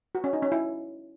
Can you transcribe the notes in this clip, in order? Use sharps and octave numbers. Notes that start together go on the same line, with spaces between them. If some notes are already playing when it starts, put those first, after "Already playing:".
F#4
C#4
D#4
C#4
E4